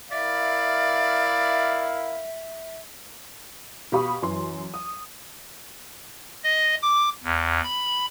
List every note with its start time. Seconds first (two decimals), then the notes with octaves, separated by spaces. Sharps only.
0.11 E4 A#4 D5 E5 F5
3.92 B2 G4 F5 B5 C#6 D#6
4.22 F#2 E3 C6
4.74 D#6
6.44 D#5
6.82 D6
7.24 E2
7.64 B5